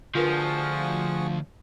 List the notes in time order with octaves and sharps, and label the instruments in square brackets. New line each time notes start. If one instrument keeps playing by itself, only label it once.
[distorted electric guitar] D2 [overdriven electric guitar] F3 [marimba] F4 A#4 B4 [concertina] F#4 G#4 C#6